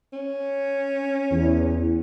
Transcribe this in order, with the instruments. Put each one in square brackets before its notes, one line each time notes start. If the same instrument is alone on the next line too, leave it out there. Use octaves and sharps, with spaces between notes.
[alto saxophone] C#4
[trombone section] E2